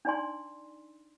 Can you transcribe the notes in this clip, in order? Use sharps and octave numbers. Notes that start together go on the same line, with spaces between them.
D4 D#4 D5 G#5 C6